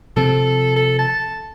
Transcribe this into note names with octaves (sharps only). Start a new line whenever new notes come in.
C3 F3 C4 A4
A4
A5